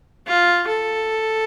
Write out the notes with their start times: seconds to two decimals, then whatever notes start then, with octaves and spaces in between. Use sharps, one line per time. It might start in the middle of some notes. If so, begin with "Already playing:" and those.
0.27 F4
0.67 A4